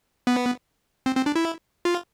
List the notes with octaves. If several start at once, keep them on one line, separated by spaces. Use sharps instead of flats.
B3
C4
C4
D4
E4
F4